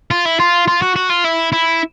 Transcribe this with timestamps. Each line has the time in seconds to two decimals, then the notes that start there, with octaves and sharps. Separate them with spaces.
0.11 F4
0.25 E4
0.39 F4
0.68 F4
0.82 F#4
0.96 F#4
1.10 F4
1.25 E4
1.52 E4